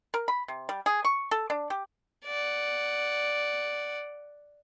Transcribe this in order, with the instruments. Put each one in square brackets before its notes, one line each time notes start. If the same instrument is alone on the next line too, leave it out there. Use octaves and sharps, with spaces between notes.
[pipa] A#4
B5
C3
G3
G#4
C#6
A4
D4
G4
[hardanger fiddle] D5 F#5